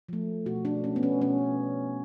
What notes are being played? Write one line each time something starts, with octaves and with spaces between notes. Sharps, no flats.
F3 A3
B2 F#4
D4
A3 C#4
B3
C#4
B2 C#4